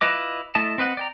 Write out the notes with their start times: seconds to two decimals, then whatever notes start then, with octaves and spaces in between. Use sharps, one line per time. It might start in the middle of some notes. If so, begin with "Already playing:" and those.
0.01 E4 F4 B4 D#5 D6
0.55 A3 E4 D#5 A5
0.78 C4 B4 D#5 F#5
0.97 D5 G5 A#5